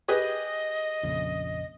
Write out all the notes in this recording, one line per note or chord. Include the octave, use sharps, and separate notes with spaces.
G4 G#4 B4 D#5
A#1 F2 C#3